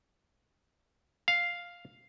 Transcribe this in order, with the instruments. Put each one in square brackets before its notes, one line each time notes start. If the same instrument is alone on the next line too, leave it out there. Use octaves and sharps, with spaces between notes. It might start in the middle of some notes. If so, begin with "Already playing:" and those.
[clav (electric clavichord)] F5